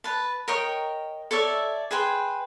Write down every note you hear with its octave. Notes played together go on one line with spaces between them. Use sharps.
B4 A5
A#4 C#5 D#5 G5
A4 C#5 D5 E5
G#4 B4 C5 G5